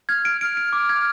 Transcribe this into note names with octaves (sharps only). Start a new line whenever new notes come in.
F6 G#6
D7
F6 D7
D7
D6
G#6